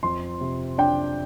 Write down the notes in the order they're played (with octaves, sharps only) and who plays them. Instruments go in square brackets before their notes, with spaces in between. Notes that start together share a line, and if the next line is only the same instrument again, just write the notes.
[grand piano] F2 C6
C3
D4 G5